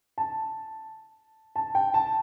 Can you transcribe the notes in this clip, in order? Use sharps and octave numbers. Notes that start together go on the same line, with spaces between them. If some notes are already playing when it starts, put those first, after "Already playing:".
A5
A5
G5
A5